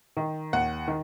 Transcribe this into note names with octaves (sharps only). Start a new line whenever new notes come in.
D#3
D#2 F#5
D#3